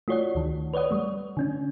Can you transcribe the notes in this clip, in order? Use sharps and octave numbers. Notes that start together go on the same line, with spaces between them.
A3 F4 F#4 C#5 D5 F#5
D2 D#3
B4 C#5 D5 F#5 D#6
G3 A3
D3 C#4 D4